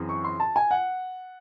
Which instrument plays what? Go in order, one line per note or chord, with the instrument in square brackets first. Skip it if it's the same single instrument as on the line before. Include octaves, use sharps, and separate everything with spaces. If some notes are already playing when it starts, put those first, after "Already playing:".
Already playing: [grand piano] F#2 E3 C4 G#4
[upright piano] C#6
C6
A5
G#5
F#5